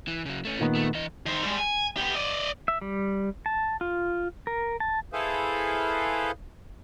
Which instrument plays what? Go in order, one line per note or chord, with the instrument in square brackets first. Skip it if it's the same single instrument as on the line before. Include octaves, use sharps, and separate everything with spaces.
[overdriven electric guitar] E3
C#3 F#3
A3 C#4
[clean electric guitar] A#2 D#3 B3
[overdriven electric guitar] A3
E3 D#5
[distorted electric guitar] D#3 C5
G3 G#3
G#5
B3 G4
D5 D#5
[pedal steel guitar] E5
G3
A5
F4
A#4
A5
[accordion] E4 G#4 A4 B4 C5 F5